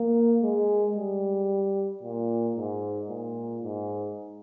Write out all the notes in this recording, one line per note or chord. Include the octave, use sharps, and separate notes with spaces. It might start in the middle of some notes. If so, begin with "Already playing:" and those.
Already playing: A#3
G#3
G3
A#2
G#2
A#2
G#2